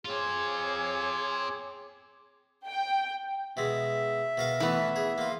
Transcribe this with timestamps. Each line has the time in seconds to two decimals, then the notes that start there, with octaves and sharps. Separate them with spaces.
0.05 C4 F4 G#4 C#5 D6
2.67 G5
3.57 B2 G#3 E5
4.37 B2 A#4 F5
4.60 E3 A3 B3 B4
4.96 G#4
5.18 A#3 F4